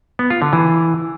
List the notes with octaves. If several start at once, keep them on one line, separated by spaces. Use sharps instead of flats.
B3
F4
D3
E3